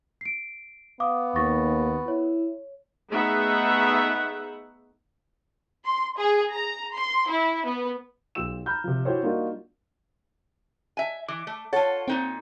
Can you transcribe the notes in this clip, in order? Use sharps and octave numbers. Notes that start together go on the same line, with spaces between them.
C7 D7
B3 F5 D6 D#6
D#2 C#6 A6 A#6
E4 C#5
A3 B3 D#4 G#4 E5 F#5
C6
G#4
A#5
C6
E4
B3
B1 F4 G4 E6 E7
A#5 B5 F6 G6
C3 F3
E4 F#4 G4 A4 C5 C#5
G3 A#3 D4 D#4 F4 F#4
E5 G#5
E3 D6
A3
F4 A4 C#5 F#5 A5
A#2 C4 D#4 G5